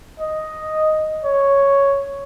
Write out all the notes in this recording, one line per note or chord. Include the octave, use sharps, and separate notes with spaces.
D#5
C#5